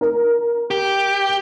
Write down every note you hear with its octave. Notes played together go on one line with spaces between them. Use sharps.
A#4
G4